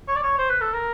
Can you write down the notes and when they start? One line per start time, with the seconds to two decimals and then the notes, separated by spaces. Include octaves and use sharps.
0.08 C#5
0.15 D5
0.23 C#5
0.38 C5
0.50 B4
0.61 A4
0.73 A#4